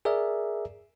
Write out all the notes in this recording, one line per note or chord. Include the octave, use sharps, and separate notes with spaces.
G#4 A#4 D5 E5